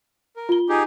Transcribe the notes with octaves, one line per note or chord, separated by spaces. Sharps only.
A#4
F4 G7
D#4 G4 G#4